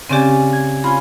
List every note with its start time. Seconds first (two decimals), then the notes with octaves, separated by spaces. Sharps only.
0.09 C#3 C4 C#4 G4 D5 G#5
0.53 G#6
0.84 C#4 F4 G#5 B5